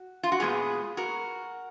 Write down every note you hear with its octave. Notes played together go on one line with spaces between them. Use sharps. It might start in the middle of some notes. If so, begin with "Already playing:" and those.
Already playing: F#4
F4
F#4
A#2 G#3 B3 F4 G#4
F#4 A#4